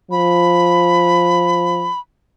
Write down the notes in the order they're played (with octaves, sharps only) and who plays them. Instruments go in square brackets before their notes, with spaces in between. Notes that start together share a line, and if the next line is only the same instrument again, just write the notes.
[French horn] F3 [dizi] B5